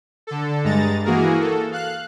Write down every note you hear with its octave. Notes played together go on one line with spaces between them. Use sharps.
D3 A4
G2 G#3 A#5 A6
E3 A#3 F#4 G#4 A#4
A4
F5 F#6